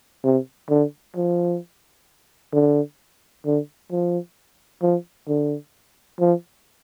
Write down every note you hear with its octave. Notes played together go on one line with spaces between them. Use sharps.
C3
D3
F3
D3
D3
F3
F3
D3
F3